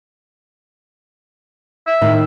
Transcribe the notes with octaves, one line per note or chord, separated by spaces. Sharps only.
E5
A2 D#3